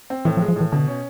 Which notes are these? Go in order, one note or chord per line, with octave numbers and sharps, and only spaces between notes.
C4
A2 E3
F3
G#3
F3
A2 E3
B2 D3
C#4